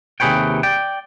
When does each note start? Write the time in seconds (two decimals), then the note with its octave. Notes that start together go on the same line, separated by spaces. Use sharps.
0.20 D#2 C3 G#4 B4 C#5 G5
0.63 D5 G5